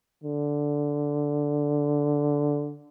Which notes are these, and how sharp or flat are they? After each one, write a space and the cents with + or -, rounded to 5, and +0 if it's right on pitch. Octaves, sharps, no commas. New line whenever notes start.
D3 -5